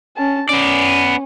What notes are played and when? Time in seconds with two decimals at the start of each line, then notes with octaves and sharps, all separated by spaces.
0.17 C#4 A5
0.49 B3 C#4 D5